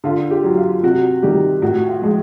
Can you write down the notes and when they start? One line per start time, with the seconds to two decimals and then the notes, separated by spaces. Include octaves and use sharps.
0.04 D3 F4
0.31 G4
0.44 F#3
0.57 F4
0.83 C3 F#4
1.23 D#3 G3 G4
1.62 A2 F#4
1.89 F4
2.02 F3 G#3